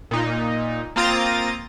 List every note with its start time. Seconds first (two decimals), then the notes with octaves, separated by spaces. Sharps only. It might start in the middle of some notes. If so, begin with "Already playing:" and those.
0.11 A#2 D#4
0.96 A#3 C4 F4 A#5 D#6 A6